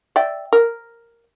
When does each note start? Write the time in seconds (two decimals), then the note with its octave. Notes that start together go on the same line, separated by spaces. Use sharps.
0.16 D5 E5 G5
0.53 A#4